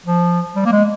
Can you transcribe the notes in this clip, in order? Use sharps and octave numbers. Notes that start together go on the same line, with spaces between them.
F3
G3
A#3
G#3